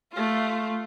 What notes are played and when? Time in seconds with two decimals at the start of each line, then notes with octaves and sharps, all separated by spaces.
0.12 A3 F4